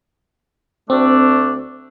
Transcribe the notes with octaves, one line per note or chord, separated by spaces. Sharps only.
D2 A3 C4 D4